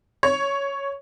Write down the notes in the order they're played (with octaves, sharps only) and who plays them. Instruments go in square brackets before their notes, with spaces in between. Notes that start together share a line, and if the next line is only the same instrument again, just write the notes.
[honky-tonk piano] C#5